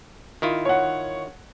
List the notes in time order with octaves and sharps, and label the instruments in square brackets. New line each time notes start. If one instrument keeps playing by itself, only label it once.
[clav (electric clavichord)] D#3 E4 F4
[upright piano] C#5 F#5